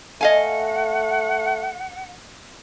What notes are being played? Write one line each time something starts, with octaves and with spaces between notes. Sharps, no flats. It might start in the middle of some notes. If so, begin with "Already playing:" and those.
A3 D#5 F5 F#5 G#5